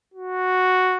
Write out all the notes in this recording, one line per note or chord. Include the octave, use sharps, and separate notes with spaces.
F#4